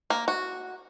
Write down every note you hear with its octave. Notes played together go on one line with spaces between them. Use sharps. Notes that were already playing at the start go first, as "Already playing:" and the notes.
A#3
F#4